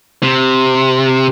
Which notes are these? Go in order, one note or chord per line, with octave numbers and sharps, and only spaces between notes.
C3